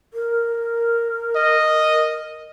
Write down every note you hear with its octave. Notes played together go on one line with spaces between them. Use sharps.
A#4
D#5